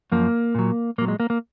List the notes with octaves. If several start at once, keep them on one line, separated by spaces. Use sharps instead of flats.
F#2 F3 A#3
A#2 F#3
A#2 F#3 A#3
G#3
A#3
A#3